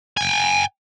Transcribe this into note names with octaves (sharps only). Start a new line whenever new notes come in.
G5 G#5